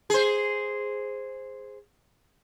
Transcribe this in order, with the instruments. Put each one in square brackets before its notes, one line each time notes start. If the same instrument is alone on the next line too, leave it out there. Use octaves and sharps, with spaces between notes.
[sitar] G#4 C5